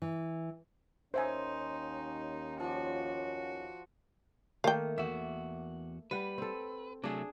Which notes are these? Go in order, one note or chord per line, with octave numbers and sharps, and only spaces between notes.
E3
D#2 C#4 D#4 C5 E5 F#5 G#5 C6
F3 F#4 D5
D#3 A3 A#3 F5 G5
E2 F#4 E5
G3 B4 F#5
C4 A4
C3 F#3 A3 D4 G#4